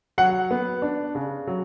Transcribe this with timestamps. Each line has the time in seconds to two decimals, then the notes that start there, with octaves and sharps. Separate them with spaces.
0.18 F#3 F#5
0.51 B3
0.82 D4
1.15 C#3
1.47 F#3